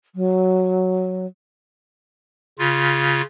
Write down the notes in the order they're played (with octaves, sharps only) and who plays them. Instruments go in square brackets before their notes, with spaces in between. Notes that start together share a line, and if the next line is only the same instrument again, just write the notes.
[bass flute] F#3
[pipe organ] C#3 F4